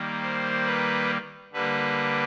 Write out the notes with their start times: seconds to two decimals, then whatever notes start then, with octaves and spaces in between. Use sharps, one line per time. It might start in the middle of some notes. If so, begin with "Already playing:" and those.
Already playing: D#3 G3 A#3
0.22 C5
0.65 B4
1.52 D3 G3 A#3 B4